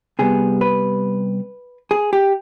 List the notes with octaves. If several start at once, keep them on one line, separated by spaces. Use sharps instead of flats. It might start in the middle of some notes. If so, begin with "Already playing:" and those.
C3 G3 B3 G#4
B4
G#4
G4